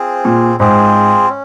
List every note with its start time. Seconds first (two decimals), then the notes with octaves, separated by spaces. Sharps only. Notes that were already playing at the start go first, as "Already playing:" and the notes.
Already playing: C4 F4 G#4 C5
0.25 A#2
0.60 G#2 C4 F4 G#4 C5
1.29 C#4